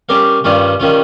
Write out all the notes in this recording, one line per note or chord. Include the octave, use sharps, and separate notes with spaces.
G3 C#4 G4 A#4 F5
G2 D#3 G3 C#4 F4
D#3 G3 C#4 F4